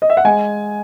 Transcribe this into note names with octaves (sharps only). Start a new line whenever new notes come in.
D#5
E5
F#5
G#3 G#5